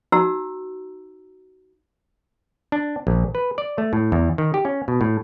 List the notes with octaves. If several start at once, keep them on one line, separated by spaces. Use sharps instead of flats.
D#4 F#4 A#5 E6
D4
A#1
B4
D5
A3
A2
E2
D#3
G4
C#4
B2
A2